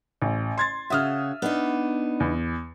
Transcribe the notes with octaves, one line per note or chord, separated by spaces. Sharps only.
A1
C6 G#6 A6
C#3 F#4 E5 D#6 F6
B3 D4 D#4
E2